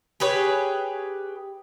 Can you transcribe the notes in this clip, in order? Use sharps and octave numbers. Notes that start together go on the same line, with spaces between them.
G4 G#4 B4 C#5